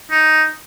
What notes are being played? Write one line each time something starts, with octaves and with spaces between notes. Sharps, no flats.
D#4